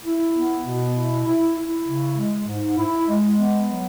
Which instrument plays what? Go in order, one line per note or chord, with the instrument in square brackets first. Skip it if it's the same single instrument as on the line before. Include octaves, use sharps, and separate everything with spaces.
[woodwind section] E4
B3
B2
E4
E4
E4
C#3
G#3
G#2
E4
G#3
B3
F#3